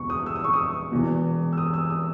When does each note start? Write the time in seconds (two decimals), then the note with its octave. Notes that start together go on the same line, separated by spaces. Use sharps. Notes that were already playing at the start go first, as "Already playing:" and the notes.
Already playing: E1 E2 B2 C#6
0.10 D#6
0.26 E6
0.36 D#6
0.44 C#6
0.53 D#6
0.91 E1 E2 B2
1.53 E6
1.58 D#6
1.74 E6
1.90 D#6